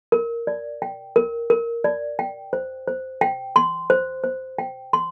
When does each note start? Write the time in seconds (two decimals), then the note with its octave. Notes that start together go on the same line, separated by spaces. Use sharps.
0.12 A#4
0.47 D5
0.82 G5
1.16 A#4
1.50 A#4
1.84 D5
2.19 G5
2.53 C5
2.88 C5
3.21 G5
3.56 C6
3.90 C5
4.24 C5
4.59 G5
4.93 C6